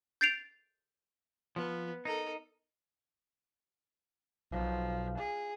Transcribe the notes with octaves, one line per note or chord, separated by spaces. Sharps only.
G6 A6 C7 D7 F7
F3 B3
D#4 A4 A#4
B1 F3
G#4